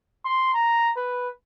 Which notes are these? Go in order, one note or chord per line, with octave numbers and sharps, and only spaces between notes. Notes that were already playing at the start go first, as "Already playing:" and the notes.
C6
A#5
B4